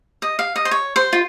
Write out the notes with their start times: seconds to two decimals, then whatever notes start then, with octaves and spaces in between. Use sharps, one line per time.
0.22 D#5
0.39 F5
0.56 D#5
0.65 C5
0.71 C#5
0.96 C5
1.13 F4